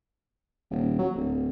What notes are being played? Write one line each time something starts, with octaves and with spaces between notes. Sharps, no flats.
D#1
F#3
D1